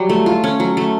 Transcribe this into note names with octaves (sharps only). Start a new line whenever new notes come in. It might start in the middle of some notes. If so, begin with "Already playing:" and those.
Already playing: F#3 G3
A3
F4
C#4
F#3
A3